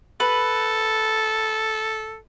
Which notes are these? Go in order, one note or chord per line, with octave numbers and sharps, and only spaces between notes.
A4 B4